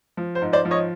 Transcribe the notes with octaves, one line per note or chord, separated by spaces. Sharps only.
F3
C5
G#2
C5 D5
F3
C#5 D#5